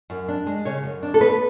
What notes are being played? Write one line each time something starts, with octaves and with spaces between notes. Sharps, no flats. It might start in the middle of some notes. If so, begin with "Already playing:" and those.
F#2
D4
G#3
C#3 C#5
F#2
D4
A4
B3 B4